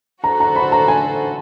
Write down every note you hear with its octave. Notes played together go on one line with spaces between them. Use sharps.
F#4 A4 C5 A#5
A#5
B5
A#5
G#5